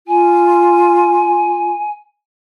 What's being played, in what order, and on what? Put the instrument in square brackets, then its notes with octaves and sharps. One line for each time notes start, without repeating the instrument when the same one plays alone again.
[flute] F4 [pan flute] G#5